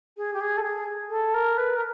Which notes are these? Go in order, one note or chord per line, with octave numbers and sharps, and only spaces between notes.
G#4
G4
G#4
A4
G#4
A4
A#4
B4
A#4